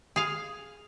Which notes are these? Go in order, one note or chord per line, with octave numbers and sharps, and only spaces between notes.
G#4 F5